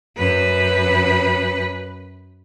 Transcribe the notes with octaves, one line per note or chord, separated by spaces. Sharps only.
F#2 B4